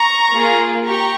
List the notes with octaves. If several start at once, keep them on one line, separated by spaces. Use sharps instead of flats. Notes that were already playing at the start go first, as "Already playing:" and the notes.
Already playing: A#5 C#6
A#3 F4 G#4
G4 A#5 C#6